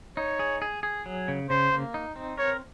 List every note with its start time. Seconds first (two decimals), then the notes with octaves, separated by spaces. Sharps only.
0.17 D#4 C#5
0.39 G#4
0.62 G#4
0.83 G#4
1.06 F#3
1.28 C#3
1.49 C#3 C5
1.72 A#3
1.94 D#4
2.16 C4
2.38 A#4 C#5